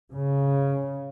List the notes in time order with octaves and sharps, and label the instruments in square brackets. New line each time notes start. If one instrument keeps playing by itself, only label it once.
[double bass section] C#3